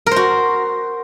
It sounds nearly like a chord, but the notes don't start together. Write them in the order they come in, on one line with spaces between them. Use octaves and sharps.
A#4 C5 F#4